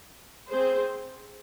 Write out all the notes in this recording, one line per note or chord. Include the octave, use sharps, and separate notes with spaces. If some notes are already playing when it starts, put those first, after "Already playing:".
C4 G#4 C5